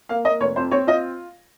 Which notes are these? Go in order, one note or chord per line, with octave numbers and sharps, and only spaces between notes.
A#3 F5
A#3 D#5
F1 C#5
F2 C5
C4 C#5
F4 D#5